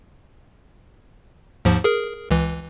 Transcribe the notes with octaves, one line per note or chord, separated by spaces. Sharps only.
D#2 G#2 F3
G#4 A#4
C#2 E3